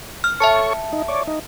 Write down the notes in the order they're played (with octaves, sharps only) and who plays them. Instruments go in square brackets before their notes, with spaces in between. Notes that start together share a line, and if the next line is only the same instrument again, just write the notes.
[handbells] F6
[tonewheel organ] A4 C#5 C#6 [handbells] E5 A5 C#7
[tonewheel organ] D#4
C#5 D5
D#4